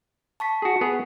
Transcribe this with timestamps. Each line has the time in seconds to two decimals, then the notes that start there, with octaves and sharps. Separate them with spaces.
0.40 A5 C#6 B6
0.62 F#4 G#4
0.81 B3 G#4